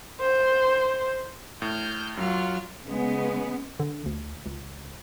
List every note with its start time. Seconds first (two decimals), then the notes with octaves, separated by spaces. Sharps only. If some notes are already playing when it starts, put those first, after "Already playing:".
0.21 C5
1.62 A2 F6 G6
2.17 F#2 F#3 F4 F6
2.86 C#3 G#3 B3
3.80 D3
4.06 D2
4.46 C#2